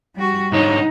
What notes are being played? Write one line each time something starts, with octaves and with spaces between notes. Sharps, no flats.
G3 F#4
G#2 D3 D#4 C#5